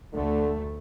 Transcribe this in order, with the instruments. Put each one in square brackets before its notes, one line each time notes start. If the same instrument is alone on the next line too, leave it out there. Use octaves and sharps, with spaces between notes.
[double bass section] D2 A3 [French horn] D3